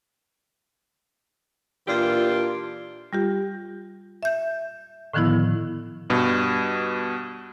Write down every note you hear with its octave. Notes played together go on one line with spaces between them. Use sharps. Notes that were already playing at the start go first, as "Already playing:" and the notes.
A#2 E3 D4 F4 G4
G3 F4 G4
E5 G6
A2 D3 D#3 F3 B3 E4
G2 B2